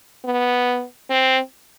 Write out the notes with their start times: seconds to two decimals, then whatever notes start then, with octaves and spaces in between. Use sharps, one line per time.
0.25 B3
1.10 C4